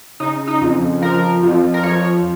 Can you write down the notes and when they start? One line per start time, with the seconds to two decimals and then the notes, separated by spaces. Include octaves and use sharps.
0.20 C#3 D#4
0.47 D#4
0.61 F2
1.02 F3 A#4
1.43 F2
1.74 A#4
1.83 F3 C#5